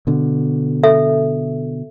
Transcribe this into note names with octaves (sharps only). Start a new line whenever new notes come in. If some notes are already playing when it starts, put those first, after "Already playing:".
B2 D3
A4 E5